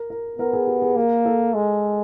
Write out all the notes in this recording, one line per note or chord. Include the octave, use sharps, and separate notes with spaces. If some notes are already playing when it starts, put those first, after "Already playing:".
Already playing: A#4
A#4
B3 A#4
G#4
G4
G#4
A#3 A#4
A4
G#3